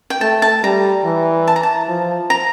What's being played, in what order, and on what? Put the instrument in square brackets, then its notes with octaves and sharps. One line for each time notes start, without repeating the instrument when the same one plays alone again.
[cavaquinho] G5
[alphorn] A3 [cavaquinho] A5
[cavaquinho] A5
[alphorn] G3 [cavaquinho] A#5
[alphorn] E3
[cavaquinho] A5
A#5
A5
[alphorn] F3
[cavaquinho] A#5